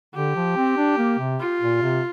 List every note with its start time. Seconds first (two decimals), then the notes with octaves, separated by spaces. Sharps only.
0.15 D3 G4
0.36 F3
0.57 C4
0.77 D4
0.98 A#3
1.19 C3
1.40 F4
1.61 A#2
1.82 C3